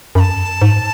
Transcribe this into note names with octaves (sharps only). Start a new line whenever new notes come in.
F#2 A5 B5
G#2